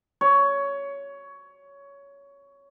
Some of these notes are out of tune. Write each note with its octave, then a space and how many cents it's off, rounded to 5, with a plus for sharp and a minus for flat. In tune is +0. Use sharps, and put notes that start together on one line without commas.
C#5 +15